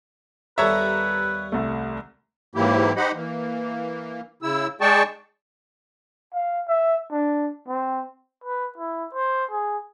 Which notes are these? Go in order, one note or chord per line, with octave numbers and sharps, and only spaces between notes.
D#2 G3 B3 A4 B4 C#5 E5 A#5
C2 A3
G#2 E3 F#3 A#3 E4 G4
D#4 G4 C5 D#5 F#5 B5
E3 A#3
C#3 E4 E6
G#3 G#4 D5 G5 A5 C#6
F5
E5
D4
C4
B4
E4
C5
G#4